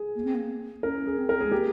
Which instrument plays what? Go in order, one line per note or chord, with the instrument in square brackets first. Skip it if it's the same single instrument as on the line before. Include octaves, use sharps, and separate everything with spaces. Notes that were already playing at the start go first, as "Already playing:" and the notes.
Already playing: [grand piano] G#4
[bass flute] A#3
C4
A#3
[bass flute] C#4 [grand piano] A#4
[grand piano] G#4
[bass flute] C4
[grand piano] A#4
[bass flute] G#3 [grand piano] G#4
[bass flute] A#3 [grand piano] G4